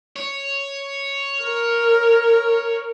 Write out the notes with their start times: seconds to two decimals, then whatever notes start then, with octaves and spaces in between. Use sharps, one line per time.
0.16 C#5
1.42 A#4